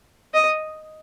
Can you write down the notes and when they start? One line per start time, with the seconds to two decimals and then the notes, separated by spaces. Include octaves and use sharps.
0.34 D#5